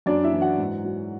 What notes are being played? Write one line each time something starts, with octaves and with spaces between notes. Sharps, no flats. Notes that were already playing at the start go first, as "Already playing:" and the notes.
F#2 D4 D5
E4 E5
E3
F#4 F#5
G#2
F#3